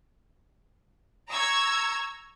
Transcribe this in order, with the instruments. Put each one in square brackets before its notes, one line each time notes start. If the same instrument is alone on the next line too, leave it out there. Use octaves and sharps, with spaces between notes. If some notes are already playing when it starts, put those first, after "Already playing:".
[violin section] A#5 C#6 E6 G#6